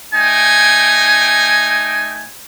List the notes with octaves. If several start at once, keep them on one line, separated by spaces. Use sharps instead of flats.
A3 D#4 G5 G#5